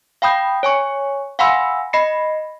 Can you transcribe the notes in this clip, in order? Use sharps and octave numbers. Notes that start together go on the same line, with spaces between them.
F5 G5 B5 D#6 G6
C#5 G#5 C#6
F5 F#5 G#5 B5 C6 E6
D#5 B5 A#6 C7 C#7